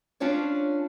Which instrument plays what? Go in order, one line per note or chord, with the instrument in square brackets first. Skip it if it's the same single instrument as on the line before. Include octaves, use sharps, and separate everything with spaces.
[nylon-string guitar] C#4 D4 F4 C5 C#5